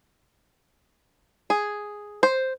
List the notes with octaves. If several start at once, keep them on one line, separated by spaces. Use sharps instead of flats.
G#4
C5